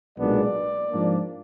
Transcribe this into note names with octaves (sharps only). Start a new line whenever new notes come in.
B1 A#2 G#3 B3 D4 D5
G#2 F3 A#3 D4